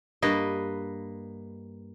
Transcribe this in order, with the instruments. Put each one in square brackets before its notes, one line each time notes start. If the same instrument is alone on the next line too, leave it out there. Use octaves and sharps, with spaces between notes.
[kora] G2 A#3 B4 D#5